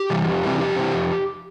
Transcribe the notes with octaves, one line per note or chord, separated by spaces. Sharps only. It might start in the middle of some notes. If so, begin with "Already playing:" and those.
Already playing: G4
C3 E3 G3
F2
C3 E3 G3
F2 G4
C3 E3 G3
F2